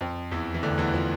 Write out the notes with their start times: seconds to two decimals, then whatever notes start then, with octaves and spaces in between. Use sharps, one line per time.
0.01 F2 F3
0.31 E2 E3
0.54 E3
0.63 D2 D3
0.78 E2 E3
0.94 F3